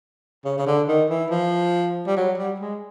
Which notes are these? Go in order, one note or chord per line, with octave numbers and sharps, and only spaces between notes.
C#3
C#3
D3
D#3
E3
F3
G3
F#3
G3
G#3